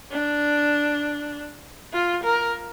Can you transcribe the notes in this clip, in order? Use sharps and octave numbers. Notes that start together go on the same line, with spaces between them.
D4
F4
A#4